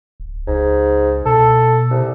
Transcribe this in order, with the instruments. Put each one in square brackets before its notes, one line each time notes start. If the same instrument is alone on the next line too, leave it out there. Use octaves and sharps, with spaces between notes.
[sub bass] D1
[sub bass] C#2 [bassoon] G#2
[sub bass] B2 [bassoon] A4
[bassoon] C2